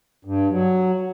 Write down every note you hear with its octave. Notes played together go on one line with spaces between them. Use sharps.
G2
F#3